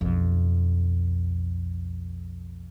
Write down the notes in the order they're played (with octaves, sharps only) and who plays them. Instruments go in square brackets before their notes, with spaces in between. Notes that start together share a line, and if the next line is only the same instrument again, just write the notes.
[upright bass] B1 F2